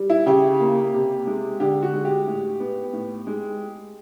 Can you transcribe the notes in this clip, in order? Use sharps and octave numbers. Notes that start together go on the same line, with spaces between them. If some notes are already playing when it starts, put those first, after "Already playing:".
Already playing: G3
E4
C#3 G4
A#3
C3
G#3
D3 G4
F#4
G#3
G4
A2
B3
A2
G#3